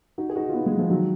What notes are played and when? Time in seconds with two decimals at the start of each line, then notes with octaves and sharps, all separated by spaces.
0.18 D#4 F#4
0.29 G#4
0.36 D#4 F#4
0.49 F4
0.54 B3 D#4
0.66 G#3 B3
0.78 F3 G#3
0.90 D#3 F#3